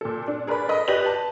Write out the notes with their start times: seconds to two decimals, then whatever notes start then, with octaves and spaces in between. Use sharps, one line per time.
0.01 A#2 A4
0.28 D4
0.47 G#4 A#4 B4 D5 B5
0.69 A4 D#5 B5 D#6
0.88 G4 B4 D5 A#6 F#7
1.06 A5